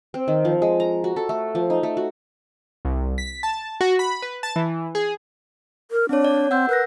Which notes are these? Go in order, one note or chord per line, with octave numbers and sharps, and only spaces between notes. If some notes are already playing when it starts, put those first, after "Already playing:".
C4
D#3
F3
G#3
A#5
F#4
A4
A3
F3
D#4
A3
F#4
C2
B6
A5
F#4
B5
B4
A5
E3
G#4
A#4
C4 D4 C#5
D5
C4 F#5 E6 G6
A#4 B4 A#6